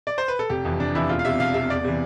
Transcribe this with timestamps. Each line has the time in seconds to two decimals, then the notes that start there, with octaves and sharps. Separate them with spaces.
0.07 D5
0.18 C5
0.28 B4
0.39 A4
0.50 F1 G4
0.65 F2 E3
0.80 F1 D4
0.95 F2 E3 E4
1.09 E1 F4
1.19 F5
1.25 E2 C3 E5
1.40 E1 F5
1.54 E2 C3 E5
1.70 E2 D5
1.84 C3 E3